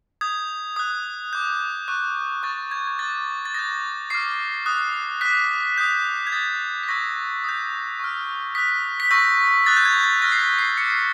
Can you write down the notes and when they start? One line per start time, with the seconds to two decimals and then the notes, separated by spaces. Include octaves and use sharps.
0.21 D#6 G6 G#6
0.76 D#6 F#6
1.33 D6 G6
1.88 C#6 F#6
2.43 C#6 F#6 A6
2.71 G#6
2.87 G#6
2.99 D6 F#6 A6
3.45 A6
3.54 D#6 G6 A#6
4.10 D6 F6 C7
4.66 D#6 F#6
5.21 D6 F#6 B6
5.78 D#6 G6
6.27 G#6
6.32 D#6 G6 A6
6.83 B6
6.89 C#6 E6 G6 A#6
7.44 D#6 G6
8.00 C#6 F6
8.55 D#6 F#6 B6
9.00 B6
9.10 C#6 E6 G6 A#6
9.66 D#6 F#6 A6
9.77 G6
9.85 G#6
10.03 A6
10.21 C#6 F6 A#6
10.32 C7
10.40 B6
10.58 C7
10.77 D6 G6 C#7
10.90 C7